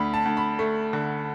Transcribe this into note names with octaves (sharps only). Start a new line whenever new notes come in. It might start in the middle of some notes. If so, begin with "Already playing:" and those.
Already playing: D2 B5
A5
D2
B5
A3
D3